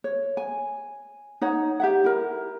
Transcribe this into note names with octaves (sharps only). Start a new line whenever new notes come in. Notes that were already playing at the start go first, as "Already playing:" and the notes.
C#5
G#5
D#4 C#5 F#5
G4 E5 F#5
E4 A#4